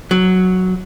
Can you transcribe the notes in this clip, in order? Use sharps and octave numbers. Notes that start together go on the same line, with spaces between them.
F#3